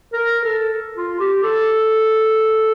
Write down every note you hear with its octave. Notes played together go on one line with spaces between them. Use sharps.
A#4
A4
F4
G4
A4